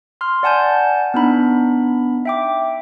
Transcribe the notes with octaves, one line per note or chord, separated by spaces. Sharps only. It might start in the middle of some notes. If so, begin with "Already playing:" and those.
C6 F6
D5 F#5 G#5 A5 G6
B3 D4 D#4 B5
E5 G5 D6